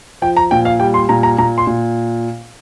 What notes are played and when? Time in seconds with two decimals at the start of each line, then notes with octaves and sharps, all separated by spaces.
0.22 F3 G5
0.37 A#5
0.51 A#2 G5
0.65 F5
0.80 G3 G5
0.94 C6
1.09 A#2 A#5
1.23 A#5
1.38 A#2 A#5
1.58 C6
1.67 A#2